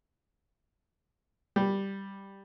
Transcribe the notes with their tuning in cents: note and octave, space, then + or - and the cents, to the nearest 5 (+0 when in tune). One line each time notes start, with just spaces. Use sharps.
G3 +0 G4 +0